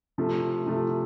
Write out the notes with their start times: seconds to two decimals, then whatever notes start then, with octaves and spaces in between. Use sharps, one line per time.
0.18 C3 F3 A3
0.66 C3 F3 A3